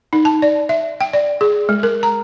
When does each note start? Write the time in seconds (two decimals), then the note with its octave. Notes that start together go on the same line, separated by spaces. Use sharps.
0.13 D#4
0.25 A5
0.42 D5
0.69 E5
1.01 G5
1.13 D5
1.41 G#4
1.69 G#3
1.83 A#4
2.03 A#5